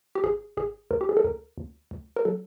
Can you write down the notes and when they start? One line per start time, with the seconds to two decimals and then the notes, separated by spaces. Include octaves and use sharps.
0.15 G4
0.23 G#1 G#4
0.57 G#1 G#4
0.91 D2 A#4
1.01 G4
1.09 G#4
1.17 A4
1.24 D2 A#4
1.58 D2
1.91 D2
2.16 A#4
2.25 F#3 A4